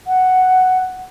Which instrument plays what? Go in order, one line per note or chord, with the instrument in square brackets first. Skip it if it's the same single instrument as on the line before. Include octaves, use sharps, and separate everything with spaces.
[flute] F#5